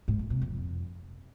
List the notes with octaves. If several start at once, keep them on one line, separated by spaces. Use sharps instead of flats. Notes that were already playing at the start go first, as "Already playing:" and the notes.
G#2
G2
C3
F2